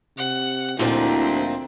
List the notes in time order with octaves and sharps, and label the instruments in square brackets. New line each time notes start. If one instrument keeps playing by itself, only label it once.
[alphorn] C3 [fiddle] F#5
[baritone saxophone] D2 [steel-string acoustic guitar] A#2 F3 D#4 [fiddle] C4 [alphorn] E4